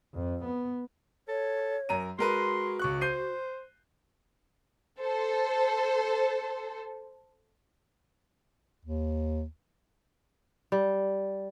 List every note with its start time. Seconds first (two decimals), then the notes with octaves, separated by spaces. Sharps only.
0.14 F2
0.45 B3
1.28 A4 C#5
1.89 F#2 A#4 A#5 D#7
2.19 G#3 F#4 A#4 B4 C6
2.79 C#2 C#6 F#6
3.01 C5 G6 C7 D#7
5.00 A4 C5
8.85 D#2
10.72 G3